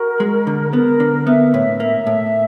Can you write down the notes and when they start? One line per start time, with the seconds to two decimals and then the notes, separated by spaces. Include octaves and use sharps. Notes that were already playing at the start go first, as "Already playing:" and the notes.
Already playing: F#4 A#4
0.20 G#3
0.47 D3
0.73 B3 A#4
1.00 D3
1.26 B3 E5
1.54 A2
1.80 A#3 E5
2.07 A2